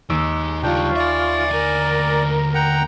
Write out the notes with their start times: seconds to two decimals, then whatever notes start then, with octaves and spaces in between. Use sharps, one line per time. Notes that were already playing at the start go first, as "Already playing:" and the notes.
0.10 D#2 G#3 D6 E6
0.63 C#2 G3 D4 F4 G5 C#6
0.96 D5 E5 G#5
1.51 D2 A#4 G#5
2.55 F#5 G5 A#5